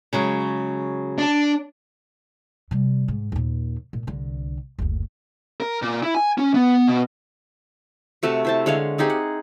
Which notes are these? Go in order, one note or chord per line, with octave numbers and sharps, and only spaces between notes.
C#3 F#3 G#3
D4
C3 G3
G#2
D#2 A#2
A#2
C2 D3
F#1 D2
A#4
A#2
E4
G#5
C#4
B3
B2
C3 A3 F#4 A5
E4 C5 A5
D3 G#3 C#5 F5
C4 D#4 G4 G#4
F#5